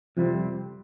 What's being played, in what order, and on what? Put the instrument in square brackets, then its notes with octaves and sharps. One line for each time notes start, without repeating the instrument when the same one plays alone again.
[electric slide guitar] F2 C3 G3 C4 [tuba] F3